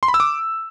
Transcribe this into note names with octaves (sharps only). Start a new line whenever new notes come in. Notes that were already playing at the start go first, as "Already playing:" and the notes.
C6
B5
E6
D6